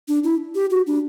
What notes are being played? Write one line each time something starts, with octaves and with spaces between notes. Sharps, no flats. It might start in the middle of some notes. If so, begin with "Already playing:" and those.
D4
E4
G4
F#4
D4